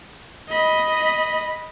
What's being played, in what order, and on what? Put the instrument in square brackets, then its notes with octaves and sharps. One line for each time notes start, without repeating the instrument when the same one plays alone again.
[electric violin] D#5 B5